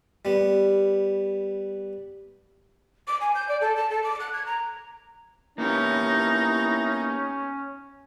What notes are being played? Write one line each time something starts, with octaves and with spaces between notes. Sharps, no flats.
G3 B3
D6
G#5
G6
D5
A4
A5
A4
D6
F#6
G#6
A#5
A#3 B3 C#4 D#4 E4 G4 A#5